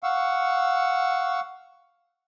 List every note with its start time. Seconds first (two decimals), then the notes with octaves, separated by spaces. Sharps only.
0.03 F5 F#5 C#6 E6